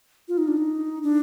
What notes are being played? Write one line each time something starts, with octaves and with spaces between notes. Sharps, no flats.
F4
D#4
D4
D#4
D4